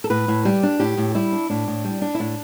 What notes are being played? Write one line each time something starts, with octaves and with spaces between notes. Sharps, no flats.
A4
A2 B4
A2
G3 G4
D4
A2 G4
A2
G3 E4
D4
A2 D4
A2
G3
D4
E4
A2 D4